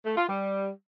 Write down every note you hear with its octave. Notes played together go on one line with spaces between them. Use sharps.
A3
F4
G3